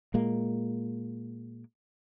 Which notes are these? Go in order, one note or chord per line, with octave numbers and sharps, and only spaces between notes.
A#2 G#3 A#3